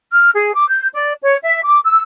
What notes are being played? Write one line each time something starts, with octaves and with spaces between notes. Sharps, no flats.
F6
G#4
D6
G6
D5
C#5
E5
D6
E6